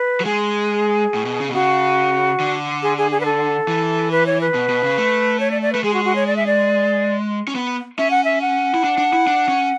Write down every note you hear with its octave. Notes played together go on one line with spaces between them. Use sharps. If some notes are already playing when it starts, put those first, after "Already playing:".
Already playing: B4
F#3
G#3 G#4
A2
B2
C#3
B2
C#3 F#4
D3
G#4
G#4
G#4
B4
A4
E3
B4
C#5
B4
B2
B2
C#3
A3
C#5
D5
D5
A3 B4
G#3 G#4
F#4
F#4
C#5
D5
E5
D5
C#4
B3
C#4 E5
F#5
E5
F#5
E4
D4
D4
E4
D4
C#4